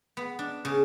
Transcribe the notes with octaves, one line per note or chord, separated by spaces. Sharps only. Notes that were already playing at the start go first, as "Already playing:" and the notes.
B3
D4
C#3